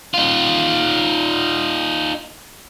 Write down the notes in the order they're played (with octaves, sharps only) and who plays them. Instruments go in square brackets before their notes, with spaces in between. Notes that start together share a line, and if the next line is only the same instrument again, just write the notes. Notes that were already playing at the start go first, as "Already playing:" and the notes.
[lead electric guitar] D#4 F4